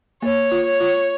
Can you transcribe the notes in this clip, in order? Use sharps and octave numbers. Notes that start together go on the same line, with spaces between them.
A#3 C#5
F4
C#5
F4